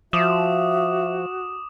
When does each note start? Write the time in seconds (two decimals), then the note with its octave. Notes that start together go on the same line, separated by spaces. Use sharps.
0.13 F3 F#4 E5 D6 D#6 E7